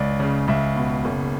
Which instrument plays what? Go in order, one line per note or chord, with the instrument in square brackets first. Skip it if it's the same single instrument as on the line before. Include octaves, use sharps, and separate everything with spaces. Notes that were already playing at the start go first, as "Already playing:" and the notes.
Already playing: [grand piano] C#2 D5
C#3
C#2 E5
B2
F#1